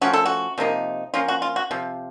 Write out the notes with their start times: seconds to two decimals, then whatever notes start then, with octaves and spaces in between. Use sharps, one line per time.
0.01 F3 A3 C#4 F#4
0.13 A4
0.26 F#4
0.58 C3 F3 A#3 D#4
1.14 F3 A#3 C#4 F4
1.28 F#4
1.42 F4
1.56 F#4
1.71 C3 F3